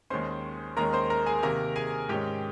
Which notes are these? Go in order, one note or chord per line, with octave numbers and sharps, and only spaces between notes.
D#2 D#3 G#3 C#4 C5 C6
D#2 D#3 G#3 C#4 A#4 A#5
C5 C6
A#4 A#5
G#4 G#5
C3 D#3 A#3 A#4 A#5
G#4 G#5
G#2 D#3 G#3 C#4 G4 G5